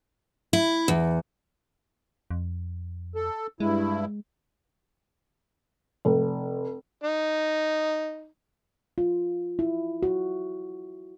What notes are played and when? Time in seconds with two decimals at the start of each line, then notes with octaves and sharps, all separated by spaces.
0.53 E4
0.88 E2
2.31 F2
3.15 A4
3.60 G2 G#3 E4
6.05 F1
7.04 D#4
8.98 F4
9.59 E4
10.03 F#4